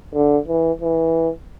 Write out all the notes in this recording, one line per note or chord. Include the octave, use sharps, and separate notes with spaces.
D3
E3
E3